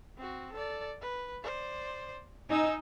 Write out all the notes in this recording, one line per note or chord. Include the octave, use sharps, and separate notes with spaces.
C4 F#4
A4 D5
B4
C5 D5
D#4 G#5 E6